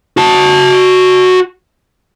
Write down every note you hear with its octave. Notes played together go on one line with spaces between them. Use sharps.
F#4 A5